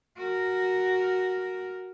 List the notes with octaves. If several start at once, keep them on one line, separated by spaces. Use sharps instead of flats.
F#4 A#4